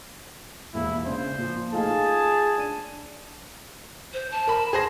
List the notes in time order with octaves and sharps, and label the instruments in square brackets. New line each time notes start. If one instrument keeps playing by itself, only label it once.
[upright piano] E1 D#2 [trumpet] E4
[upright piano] C#3 D4 [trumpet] C5
[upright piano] A#2 F3
[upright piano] A3 D#4 F4 [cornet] G#4 [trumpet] A5
[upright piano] D4 D#7
[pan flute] C5
A5
[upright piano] A#4 B5
G#4 C5 A#6